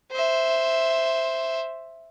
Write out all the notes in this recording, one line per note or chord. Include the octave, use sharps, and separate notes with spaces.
C5 E5